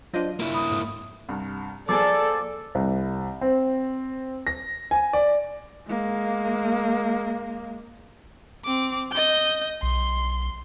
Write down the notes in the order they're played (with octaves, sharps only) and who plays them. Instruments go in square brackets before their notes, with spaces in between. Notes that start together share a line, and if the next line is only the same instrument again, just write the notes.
[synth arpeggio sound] F#3 D4 [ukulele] F4 C5 D#5
[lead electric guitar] A#3 E4 [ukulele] B4
[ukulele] B5 [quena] D#6
[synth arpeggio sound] F2 G#2
[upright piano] C2 G2
[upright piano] F3 A#3 G#4 [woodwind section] A4 [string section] D5 [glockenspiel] D6
[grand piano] C2
C4
A#6
G#5
D5
[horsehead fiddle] G#3 A#3
[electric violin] C4 D6
D#5 G6
[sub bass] B1 [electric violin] C6